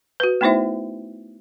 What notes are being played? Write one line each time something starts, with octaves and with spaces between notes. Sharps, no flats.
F#4 B4
A3 B3 D#4 E4 C5 E5